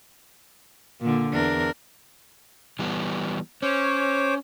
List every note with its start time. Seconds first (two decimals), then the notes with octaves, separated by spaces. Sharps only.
1.01 A#2 D3
1.33 E2 D4 A#4
2.79 E3 G3 B3
3.62 C#4 C5 C#5 D6